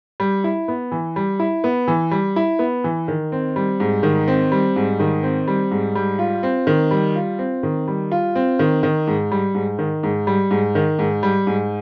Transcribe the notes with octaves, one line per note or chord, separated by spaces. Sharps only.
G3
E4
B3
E3
G3
E4
B3
E3
G3
E4
B3
E3
D#3
C4
G3
G#2
D#3
C4
G3
G#2
D#3
C4
G3
G#2
G3
F4
C4
D#3
G3
F4
C4
D#3
G3
F4
C4
D#3
D#3
G#2
G3
G#2
D#3
G#2
G3
G#2
D#3
G#2
G3
G#2